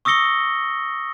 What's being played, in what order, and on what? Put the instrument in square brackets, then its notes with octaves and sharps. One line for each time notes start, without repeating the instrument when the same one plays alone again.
[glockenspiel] C#6 D#6 E6 A#6 C#7 G7